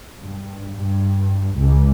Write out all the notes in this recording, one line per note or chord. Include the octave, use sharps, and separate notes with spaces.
G2
G2
C#2